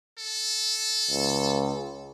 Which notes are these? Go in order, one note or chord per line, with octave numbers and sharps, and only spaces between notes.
A4
C#2